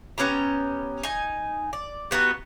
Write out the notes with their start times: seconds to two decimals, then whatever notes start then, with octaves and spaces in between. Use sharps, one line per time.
0.18 B3 C#4 G4 A#5
1.03 D#4 G#5
1.73 D5
2.11 G3 B3 D#4 F#4